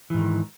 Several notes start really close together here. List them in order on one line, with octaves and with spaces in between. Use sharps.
E3 G#2 D#3